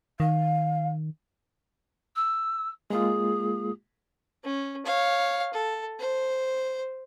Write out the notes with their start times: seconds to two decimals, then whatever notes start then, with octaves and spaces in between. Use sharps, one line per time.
0.20 D#3 F5
2.16 E6
2.90 G#3 A#3 F4 G#4
4.44 C#4
4.86 C#5 F5
5.53 A4
5.99 C5